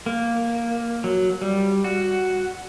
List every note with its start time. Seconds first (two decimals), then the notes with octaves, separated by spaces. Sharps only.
0.06 A#3
1.04 F#3
1.41 G3
1.84 F#4